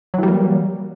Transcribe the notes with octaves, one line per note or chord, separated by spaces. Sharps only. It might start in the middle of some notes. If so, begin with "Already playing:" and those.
E3 F#3 G3 A#3